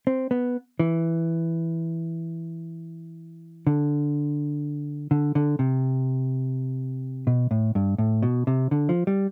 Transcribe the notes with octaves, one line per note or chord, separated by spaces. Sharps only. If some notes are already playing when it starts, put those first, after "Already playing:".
C4
B3
E3
D3
D3
D3
C3
B2
A2
G2
A2
B2
C3
D3
F3
G3